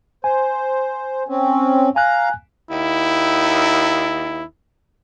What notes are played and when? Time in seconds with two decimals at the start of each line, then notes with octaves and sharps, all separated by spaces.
0.24 C5 G#5
1.28 C4 C#4
1.96 F5 G#5 A#5 F#6
2.71 D#2 E4